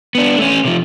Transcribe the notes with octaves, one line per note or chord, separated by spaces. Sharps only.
B3 D4
A3 C#4
C3 F3